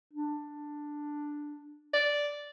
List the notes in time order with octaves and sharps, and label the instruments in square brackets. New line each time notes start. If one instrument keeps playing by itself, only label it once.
[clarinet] D4
[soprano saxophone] D5